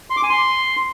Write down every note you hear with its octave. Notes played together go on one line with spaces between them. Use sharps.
C6
D6
G#5
C6